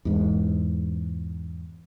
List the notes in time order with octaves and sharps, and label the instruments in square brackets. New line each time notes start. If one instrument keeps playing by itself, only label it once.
[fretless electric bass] E2 G#2